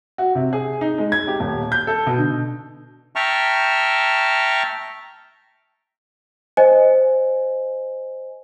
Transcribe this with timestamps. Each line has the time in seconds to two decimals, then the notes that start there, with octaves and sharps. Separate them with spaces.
0.18 F#4
0.35 C3
0.53 G#4
0.81 D#4
0.98 G#3
1.12 G#6
1.27 G4
1.40 D#1
1.72 G6
1.87 A4
2.06 B2
2.18 D3
3.16 E5 G5 A5 A#5 C#6 F6
6.57 C5 D#5 G#5